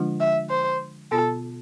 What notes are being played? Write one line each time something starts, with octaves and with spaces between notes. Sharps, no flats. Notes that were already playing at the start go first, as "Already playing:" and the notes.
Already playing: D3 F3 G#3 D4 F4
E5
C5
B2 B3 F4 A4